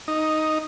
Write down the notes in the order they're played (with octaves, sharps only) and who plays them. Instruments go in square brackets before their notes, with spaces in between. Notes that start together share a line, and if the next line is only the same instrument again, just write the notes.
[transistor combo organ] D#4